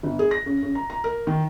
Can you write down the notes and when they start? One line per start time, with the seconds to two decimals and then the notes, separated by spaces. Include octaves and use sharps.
0.03 G1
0.19 G#4
0.31 A#6
0.46 C#3
0.62 C#3
0.75 A#5
0.90 A#5
1.04 A#4
1.27 D#3